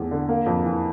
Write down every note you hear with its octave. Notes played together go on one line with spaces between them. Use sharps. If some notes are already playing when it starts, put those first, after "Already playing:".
Already playing: E2 A3
D3
A#3
F2
E3